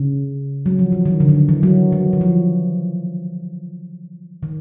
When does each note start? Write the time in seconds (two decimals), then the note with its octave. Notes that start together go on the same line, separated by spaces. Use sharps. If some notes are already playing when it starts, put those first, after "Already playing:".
Already playing: C#3
0.66 F#3
0.79 F3
0.92 E3
1.06 D#3
1.20 D3
1.28 D#3
1.35 E3
1.49 E3
1.63 F#3
1.92 F#3
2.13 E3
2.21 F3
4.43 D#3